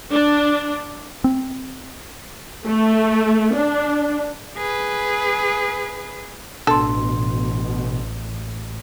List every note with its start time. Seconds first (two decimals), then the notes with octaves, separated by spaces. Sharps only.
0.11 D4
1.24 C4
2.68 A3
3.56 D4
4.57 G#4 B4
6.67 A1 B2 D4 A4 C6